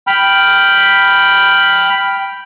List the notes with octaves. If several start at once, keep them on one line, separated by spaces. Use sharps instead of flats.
G5 B5 F6